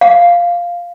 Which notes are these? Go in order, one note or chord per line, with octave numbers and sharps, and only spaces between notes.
F5